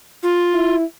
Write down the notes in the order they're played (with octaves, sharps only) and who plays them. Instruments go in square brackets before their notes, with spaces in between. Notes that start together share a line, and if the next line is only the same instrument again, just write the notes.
[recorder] F4
[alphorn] E4